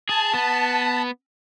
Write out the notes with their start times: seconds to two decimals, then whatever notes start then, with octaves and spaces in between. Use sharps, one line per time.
0.09 G#4 A5
0.34 B3